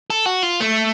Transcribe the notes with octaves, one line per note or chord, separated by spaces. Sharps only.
A4
F#4
F4
A3